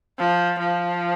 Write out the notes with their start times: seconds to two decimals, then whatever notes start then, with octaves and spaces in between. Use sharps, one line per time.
0.19 F3
0.59 F3